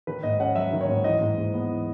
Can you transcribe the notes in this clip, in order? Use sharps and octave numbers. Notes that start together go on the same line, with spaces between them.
D#3 B4
G#2 D#5
C#4 F#5
F#3 E5
D#3
C#5
G#2
E3 D#5
G#2
G#2
B3
E3